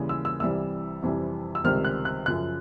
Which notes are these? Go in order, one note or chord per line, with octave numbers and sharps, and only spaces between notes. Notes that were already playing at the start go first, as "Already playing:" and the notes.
Already playing: D#2 C#3 E3 G3
E6
E6
C2 C3 E3 G3 E6
F2 C3 E3 G3
E6
C#2 C3 D#3 G3 F6
F#6
F#6
F#2 C#3 F3 F#6